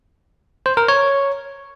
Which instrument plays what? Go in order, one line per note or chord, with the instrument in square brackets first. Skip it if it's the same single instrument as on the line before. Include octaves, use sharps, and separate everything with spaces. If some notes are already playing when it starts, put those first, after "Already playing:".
[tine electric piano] C5
A#4
C#5